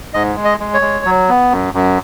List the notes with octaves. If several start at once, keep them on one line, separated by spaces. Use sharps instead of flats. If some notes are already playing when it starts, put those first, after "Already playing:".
G#2 D#5
G#3
D#5
G#3
C#5
G#3
F#3
B3
F#2
F#2